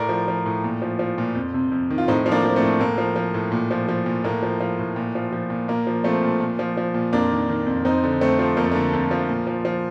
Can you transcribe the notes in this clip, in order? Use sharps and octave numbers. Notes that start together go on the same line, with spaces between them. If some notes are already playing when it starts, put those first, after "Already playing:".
Already playing: A2 A#4 D5
F3
F3
A2
A#2
F3
F3
A#2
F2
C3
F2
D#3
F4
A2 C4 D#4
F3
A#3 D4
F3
A3 C4
A2
A2 A#3
F3
F3
A2
A#2
F3
F3
A#2
A2 A#3
F3
F3
A2
A#2
F3
F3
A#2
A#2 A#3
F3
F3 A3 C4
A#2
A#2
F3
F3
A#2
F2 A#3 D4
D#3
D#3
F2
F2 C4 D#4
D3
F2 A3 C4
F3
F2 A#3
A3
D3 A#3
F2
F3
A#2
F3
F3